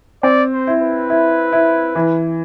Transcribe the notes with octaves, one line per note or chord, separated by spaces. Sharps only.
C4 D5
C5
E4
B4
E4
E4
E3